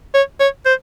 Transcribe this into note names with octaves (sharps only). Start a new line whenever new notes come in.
C#5
C#5
C5